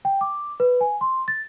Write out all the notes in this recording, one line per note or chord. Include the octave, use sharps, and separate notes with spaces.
G5
D6
B4
G#5
C6
A6